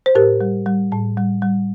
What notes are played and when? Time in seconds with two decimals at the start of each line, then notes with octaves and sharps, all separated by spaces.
0.06 C5
0.15 A2 G4 A#4
0.41 G3
0.66 G3
0.92 A2
1.17 G3
1.42 G3